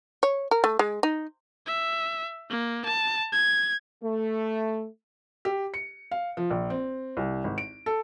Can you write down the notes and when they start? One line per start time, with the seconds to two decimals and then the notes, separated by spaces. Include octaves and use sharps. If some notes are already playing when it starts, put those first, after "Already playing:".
0.23 C#5
0.51 A#4
0.64 A3
0.79 G#3
1.03 D#4
1.67 E5
2.50 A#3
2.86 A5
3.33 G#6
4.03 A3
5.45 G4
5.74 C#7
6.11 F5
6.37 F3
6.51 A#1
6.70 C4
7.17 C2
7.44 G#1
7.58 D7
7.86 A4